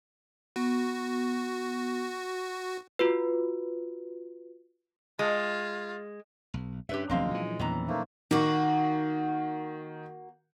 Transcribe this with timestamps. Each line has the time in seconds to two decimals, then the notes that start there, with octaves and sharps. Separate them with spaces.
0.56 B3 F#4
2.99 F4 F#4 B4
5.19 G#3 F4
6.54 B1
6.89 G2 C#4 D4 G4 B4 E5
7.10 E1 D2 F3 F#3 G#3 A#3 C4 F5
7.31 A#2 E3
7.59 E2 A#2 D#3 E3 C#4 A#5
7.88 A3 A#3 D#4 C5
8.31 D#3 A#3 F#4